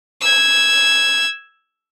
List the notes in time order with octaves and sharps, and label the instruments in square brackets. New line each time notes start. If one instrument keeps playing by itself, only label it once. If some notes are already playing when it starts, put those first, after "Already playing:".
[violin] E6 G#6